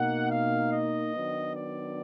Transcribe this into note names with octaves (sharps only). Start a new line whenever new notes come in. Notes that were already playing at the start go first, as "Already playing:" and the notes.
Already playing: B2 A#3 D#4 F#5
F5
D#5
D#3 F#3 B3 D4
D5